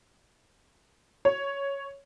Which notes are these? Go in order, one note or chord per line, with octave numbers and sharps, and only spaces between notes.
C#5